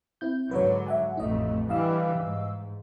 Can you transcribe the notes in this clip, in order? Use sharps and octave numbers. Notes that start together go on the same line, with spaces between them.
C4 E4 G6
G#2 D3 F#3 B4 C#5
E5 F#5 G#5
A1 F2 A3 D#4 D#5
D3 E3 G3 D#5 F5 E6
G#2